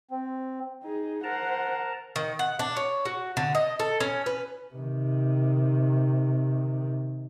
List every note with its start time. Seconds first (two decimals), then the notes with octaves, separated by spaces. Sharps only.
0.11 C4
0.83 D#4 G#4
1.24 A#4 C5 F#5 A5 A#5
2.16 D#3
2.39 F#5
2.59 D4
2.77 C#5
3.05 F#4
3.37 D3
3.55 D#5
3.80 A4
4.00 C#4
4.26 B4
4.74 C3 D#3